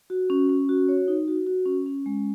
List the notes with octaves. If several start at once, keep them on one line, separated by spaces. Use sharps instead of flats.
F#4
C#4
C#4
F#4
C#5
D#4
F#4
F#4
C#4
C#4
G#3